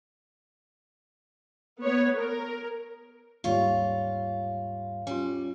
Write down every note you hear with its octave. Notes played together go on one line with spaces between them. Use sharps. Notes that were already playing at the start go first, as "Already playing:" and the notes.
B3 C#5
A#4
D#2 G#2 G3 F4 C#5
G3 C#4 F4